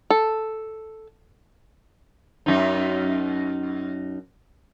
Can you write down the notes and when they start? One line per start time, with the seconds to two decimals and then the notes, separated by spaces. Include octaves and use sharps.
0.10 A4
2.46 F#2 D#4